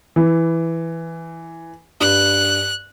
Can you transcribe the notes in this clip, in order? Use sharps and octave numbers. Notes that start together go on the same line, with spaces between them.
E3
G2 F#6